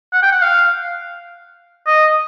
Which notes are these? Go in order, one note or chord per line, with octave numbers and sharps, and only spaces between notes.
F#5
G5
F#5
F5
D#5